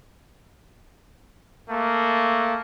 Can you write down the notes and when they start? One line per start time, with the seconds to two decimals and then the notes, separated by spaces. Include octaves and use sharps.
1.69 A3 A#3